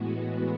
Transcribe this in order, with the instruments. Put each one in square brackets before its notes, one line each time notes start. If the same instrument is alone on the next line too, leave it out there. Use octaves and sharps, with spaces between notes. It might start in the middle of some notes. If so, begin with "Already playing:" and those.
Already playing: [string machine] A2 E3 G#3 B3 F#4